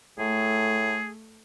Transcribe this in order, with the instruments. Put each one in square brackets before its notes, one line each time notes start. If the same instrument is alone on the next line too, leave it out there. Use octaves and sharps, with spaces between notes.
[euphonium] A2 [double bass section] A3 [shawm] G#4